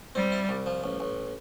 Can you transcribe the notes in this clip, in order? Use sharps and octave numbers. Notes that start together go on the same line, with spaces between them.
G3 C4
E4
C2
F3
A1
A1